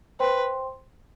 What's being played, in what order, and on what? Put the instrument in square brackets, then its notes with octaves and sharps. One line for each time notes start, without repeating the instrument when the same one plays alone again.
[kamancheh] B4 [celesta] C5 G5 C6